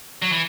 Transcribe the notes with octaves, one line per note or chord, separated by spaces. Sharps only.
F#3
E3